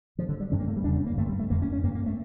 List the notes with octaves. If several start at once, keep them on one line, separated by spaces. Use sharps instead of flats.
G2 D3 F3
D3
G3
G2 D3 C#4
A#3
A3
G3
E2 C#3 D4
C#4
A#3
G2 D3 A3
G3
A3
F2 D3 A#3
C#4
C#4
G2 D3 A#3
A#3
A3